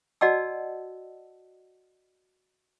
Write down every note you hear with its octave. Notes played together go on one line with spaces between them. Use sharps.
F#4 D5 D#5 F#5 A5 E6